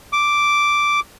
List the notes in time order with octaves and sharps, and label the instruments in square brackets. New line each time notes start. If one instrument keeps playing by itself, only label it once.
[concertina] D6